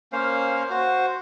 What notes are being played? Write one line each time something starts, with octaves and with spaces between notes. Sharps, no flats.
A#3 C#4 C5 F5
F#4 C5